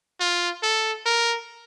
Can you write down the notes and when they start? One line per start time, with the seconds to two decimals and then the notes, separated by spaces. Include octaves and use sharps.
0.20 F4
0.63 A4
1.06 A#4